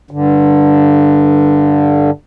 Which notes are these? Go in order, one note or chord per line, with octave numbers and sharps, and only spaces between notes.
G2 D3